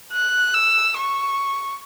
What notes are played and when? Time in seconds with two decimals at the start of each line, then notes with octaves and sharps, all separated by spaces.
0.12 F#6
0.54 E6
0.96 C#6